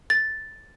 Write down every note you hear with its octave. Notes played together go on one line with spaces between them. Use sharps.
A6